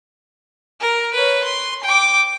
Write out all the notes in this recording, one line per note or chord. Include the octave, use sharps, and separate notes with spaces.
A#4
B4 C#5
C6
G5 D6